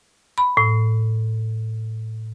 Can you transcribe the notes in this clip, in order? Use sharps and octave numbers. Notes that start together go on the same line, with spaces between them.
B5
A2